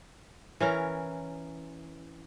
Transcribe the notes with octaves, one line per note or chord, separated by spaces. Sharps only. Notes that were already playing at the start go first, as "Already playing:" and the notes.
E3 C#4 A#4